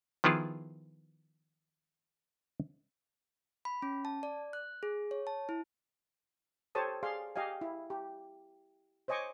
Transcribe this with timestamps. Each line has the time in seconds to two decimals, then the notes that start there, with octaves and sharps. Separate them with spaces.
0.24 D#3 F3 B3 E4 F4 G#4
3.65 B5
3.82 C#4
4.05 A5
4.23 D5
4.53 F#6
4.83 G#4
5.11 C#5
5.27 A5
5.49 E4
6.75 G4 A4 C5 C#5 A5 D#6
7.03 G#4 D5 F5 C6
7.36 G4 D#5 F5 G#5
7.61 E4
7.90 G4
9.08 C5 C#5 D#5 G#5 C#6 D6